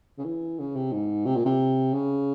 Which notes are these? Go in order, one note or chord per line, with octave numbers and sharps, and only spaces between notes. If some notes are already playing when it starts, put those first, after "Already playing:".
C#3
E3
C#3
C3
G#2
C3
A#2
C3
C#3